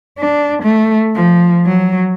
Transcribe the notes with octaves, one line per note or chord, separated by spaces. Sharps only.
D4
A3
F3
F#3